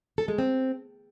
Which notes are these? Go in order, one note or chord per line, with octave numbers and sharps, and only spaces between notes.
A4
G#3
C4